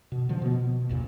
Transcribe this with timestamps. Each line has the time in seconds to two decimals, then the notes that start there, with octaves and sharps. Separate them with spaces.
0.12 B2
0.29 D3 F3
0.42 B2 B3
0.89 A1 E2 A#2 C#3